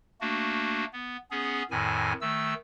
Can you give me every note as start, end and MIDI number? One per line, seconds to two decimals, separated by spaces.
0.21 0.85 57
0.21 0.85 58
0.21 0.85 62
0.21 0.85 66
0.93 1.17 59
1.31 1.63 59
1.31 1.63 61
1.31 1.63 68
1.71 2.13 41
1.71 2.13 45
1.71 2.13 51
1.71 2.13 80
2.21 2.54 51
2.21 2.54 57
2.21 2.54 88